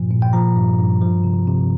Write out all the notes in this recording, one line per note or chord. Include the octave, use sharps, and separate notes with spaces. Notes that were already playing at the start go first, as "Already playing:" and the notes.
Already playing: G2 A#2 F3
A#2
G5
F3 A#5
G2
G2
F3
C3
C3